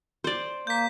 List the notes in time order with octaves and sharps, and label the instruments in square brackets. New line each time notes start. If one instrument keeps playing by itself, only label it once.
[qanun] C5 D5
[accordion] A#3 [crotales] G6 B6